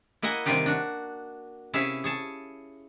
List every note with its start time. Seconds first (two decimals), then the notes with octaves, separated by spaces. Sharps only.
0.22 A#3 E4 D#5 F#5 G#5
0.45 C3 D#3 G3 F4 G4 F5
0.66 D4 F#4
1.73 C3 C#4 E4 G#4 E5 F5
2.04 G#4 C#5 A5